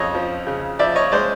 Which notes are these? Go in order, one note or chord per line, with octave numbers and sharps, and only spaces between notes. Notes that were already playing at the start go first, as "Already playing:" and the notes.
Already playing: F2 C#3 C#5 D#5
F3
C#3
F3 D5 E5
C#5 D#5
G#3 C5 D5